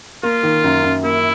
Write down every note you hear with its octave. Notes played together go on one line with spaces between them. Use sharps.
A#3 F4
D#3
F#2
F#2
A#3 E4